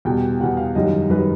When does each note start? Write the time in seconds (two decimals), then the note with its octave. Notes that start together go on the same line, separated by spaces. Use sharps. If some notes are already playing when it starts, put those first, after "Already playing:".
0.05 E2 B2 G3 G5
0.40 E2 B2 G3 F#5
0.57 F5
0.75 F#2 D#3 G3 D#5
1.10 F#2 D#3 G3 B4